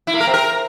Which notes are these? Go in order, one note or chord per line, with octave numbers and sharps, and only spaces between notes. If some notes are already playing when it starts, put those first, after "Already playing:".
E4
A#3
A#4
C4
A#4